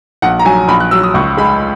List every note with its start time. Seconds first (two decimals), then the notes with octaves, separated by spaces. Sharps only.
0.22 A#1 F#5
0.39 A#5
0.45 F#3 G#5
0.68 A#1 B5
0.80 F#6
0.91 F#3 E6
1.03 D#6
1.14 C#2 C#6
1.37 G#3 B5